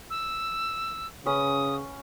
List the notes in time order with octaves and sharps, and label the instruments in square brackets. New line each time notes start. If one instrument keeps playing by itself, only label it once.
[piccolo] E6
[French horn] C#3 [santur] C#4 B4 F#5 [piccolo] D#6